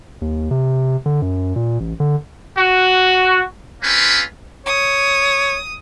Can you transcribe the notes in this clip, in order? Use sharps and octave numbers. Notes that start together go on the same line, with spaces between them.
D#2
C3
D3
F#2
A#2
A1
D3
F#4
A#3 C4 C#4 F4 B4
C#5 D#6